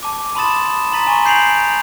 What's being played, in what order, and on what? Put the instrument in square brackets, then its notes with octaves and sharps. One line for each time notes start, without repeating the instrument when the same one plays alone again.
[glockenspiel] A5 D6
A5 B5 C6 D#6 A6 E7
A#5 C6 A6 B6 D#7 E7
G#5 A#5 C#6
G6 C7 D7 F7 F#7